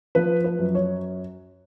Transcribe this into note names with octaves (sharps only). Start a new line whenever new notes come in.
F3 B4
B4
F#2
C#5